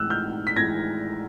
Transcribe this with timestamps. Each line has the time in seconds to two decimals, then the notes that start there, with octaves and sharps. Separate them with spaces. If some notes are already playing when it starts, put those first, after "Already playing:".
Already playing: A2 E3 G#3 E6 F#6
0.10 F6 G6
0.47 B6
0.56 A2 E3 G#3 G#6 A#6